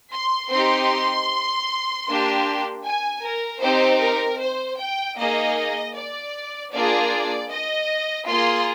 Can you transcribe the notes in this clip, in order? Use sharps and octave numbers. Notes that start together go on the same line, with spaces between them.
C6
C4 D#4 G4 C6
A#3 D4 G4
G#5
A#4
C4 D#4 G4 C5
A#4
C5
G5
A#3 D#4 G#4 D#5
D5
A#3 D4 F4 G#4 D5
D#5
A#3 F4 G#4 C6